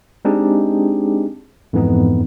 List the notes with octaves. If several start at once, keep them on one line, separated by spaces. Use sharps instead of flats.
G#3 C4 D4 D#4 G4 G#4
F2 G#2 E3 B3 D#4